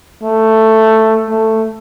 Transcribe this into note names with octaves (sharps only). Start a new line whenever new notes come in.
A3
A3